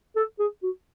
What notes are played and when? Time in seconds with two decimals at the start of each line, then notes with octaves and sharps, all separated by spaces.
0.16 A4
0.39 G#4
0.63 F#4